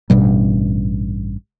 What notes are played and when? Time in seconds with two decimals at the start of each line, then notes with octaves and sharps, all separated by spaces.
0.10 A1 G2 B2 G3